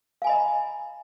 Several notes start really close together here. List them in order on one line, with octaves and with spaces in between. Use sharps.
F5 G#5 B5 D#5 A#5